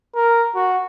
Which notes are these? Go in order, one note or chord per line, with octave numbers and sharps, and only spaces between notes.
A#4
F#4